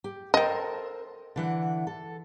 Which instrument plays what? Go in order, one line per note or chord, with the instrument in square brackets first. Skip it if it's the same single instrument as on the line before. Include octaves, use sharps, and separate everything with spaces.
[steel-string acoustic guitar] G4
[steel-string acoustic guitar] A4 A#4 C5 [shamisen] D#5 G5
[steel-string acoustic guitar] D3 E3 F#5
A4